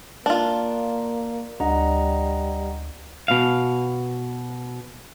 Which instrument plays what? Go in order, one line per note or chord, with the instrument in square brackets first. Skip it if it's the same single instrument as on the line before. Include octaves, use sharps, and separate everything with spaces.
[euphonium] A#3 [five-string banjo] D4 F4
[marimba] D2 [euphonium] G3 [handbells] D#5 F#5 A#5
[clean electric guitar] B2 F5